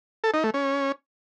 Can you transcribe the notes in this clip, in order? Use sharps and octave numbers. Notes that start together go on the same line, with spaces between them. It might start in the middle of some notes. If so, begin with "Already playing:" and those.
A4
D#4
A3
C#4